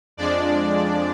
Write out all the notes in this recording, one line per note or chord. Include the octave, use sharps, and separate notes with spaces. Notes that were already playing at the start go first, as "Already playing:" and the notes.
F2 F3 G#3 D4 D5